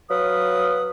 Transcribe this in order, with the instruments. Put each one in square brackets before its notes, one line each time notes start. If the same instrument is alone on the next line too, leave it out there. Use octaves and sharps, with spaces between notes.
[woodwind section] F#3 B4 F5 D#6